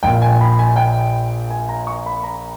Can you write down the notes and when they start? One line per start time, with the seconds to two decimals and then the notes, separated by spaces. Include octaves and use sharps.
0.03 A#1 A#2 G5
0.22 G#5
0.41 B5
0.59 G#5
0.76 G5
1.50 G#5
1.69 A#5
1.87 C#6
2.06 B5
2.23 A#5